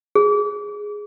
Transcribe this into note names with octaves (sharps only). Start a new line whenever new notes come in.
G#4